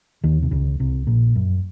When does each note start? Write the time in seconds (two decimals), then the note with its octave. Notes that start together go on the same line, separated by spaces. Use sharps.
0.24 D#2 D#3
0.43 C3
0.51 C#2 C#3
0.80 C2 C3
1.07 A#1 A#2
1.36 F#2